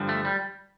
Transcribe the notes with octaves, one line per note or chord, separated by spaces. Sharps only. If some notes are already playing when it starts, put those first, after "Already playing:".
Already playing: G2 D3 F3
A3
G3